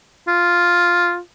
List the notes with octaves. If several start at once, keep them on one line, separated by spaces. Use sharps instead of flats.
F4